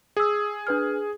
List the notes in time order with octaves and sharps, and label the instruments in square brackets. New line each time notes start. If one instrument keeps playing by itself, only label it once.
[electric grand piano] G#4 [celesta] D#6 E6
[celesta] D4 B4 F6